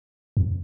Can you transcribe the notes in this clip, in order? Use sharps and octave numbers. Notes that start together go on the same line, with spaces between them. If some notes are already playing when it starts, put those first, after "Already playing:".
F2